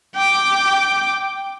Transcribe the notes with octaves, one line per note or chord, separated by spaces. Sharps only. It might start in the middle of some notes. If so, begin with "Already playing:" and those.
G5 D6